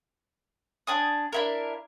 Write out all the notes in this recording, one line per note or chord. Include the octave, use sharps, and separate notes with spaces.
D4 G#5 D#6
D4 E4 A#4